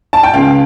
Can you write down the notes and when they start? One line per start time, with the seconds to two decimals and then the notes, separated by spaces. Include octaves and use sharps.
0.13 A5
0.23 G5
0.34 C#2 F5